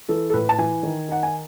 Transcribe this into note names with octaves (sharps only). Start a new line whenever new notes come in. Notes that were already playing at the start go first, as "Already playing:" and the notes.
E3 A4
A4
A2 B4
A5
E3 G#5
D#3
D#4 F#5
G#5